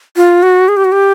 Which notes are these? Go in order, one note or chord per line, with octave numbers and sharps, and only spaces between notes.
F4
F#4
G#4
G4
F#4
G4